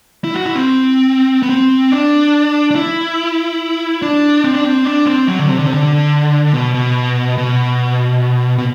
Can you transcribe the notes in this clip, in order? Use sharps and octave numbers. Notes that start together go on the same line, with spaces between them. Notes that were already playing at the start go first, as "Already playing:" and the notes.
E4
F#4
E4
C4
B3
C4
D4
D4
E4
D4
C4
D4
C4
D4
C4
F#3
D3
C3
D3
C3
D3
B2
B2
B2
B2